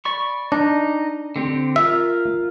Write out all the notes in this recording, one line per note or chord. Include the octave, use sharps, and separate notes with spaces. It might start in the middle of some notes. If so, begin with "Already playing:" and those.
D5 B5 C#6
D4 D#4
D3 C4 G4
F4 A#4 E5